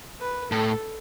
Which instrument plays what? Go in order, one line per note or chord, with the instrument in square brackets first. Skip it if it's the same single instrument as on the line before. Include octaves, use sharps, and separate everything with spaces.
[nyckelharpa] B4
[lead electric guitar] A2 [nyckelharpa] A4